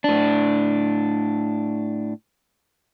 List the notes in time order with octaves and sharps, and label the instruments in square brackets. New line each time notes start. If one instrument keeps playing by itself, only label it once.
[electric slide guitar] A2 D4